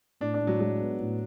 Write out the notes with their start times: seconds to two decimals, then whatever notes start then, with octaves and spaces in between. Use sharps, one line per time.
0.21 A2 D4
0.34 D4
0.40 A2
0.47 F#3
0.60 F#3 G#3
0.80 B3
1.00 A2